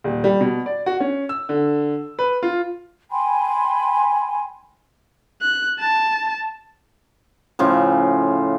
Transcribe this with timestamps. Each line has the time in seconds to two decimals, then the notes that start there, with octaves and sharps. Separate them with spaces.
0.04 D#1
0.24 G3
0.41 B2
0.66 D5
0.86 F#4
1.00 C#4
1.29 E6
1.49 D3
2.19 B4
2.43 F4
3.11 G5 G#5 B5 C6
5.41 F#6
5.79 A5
7.59 A2 C#3 F3